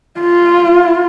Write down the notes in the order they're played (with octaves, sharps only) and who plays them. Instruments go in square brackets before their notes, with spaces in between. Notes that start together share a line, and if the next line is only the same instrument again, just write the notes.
[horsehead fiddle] F4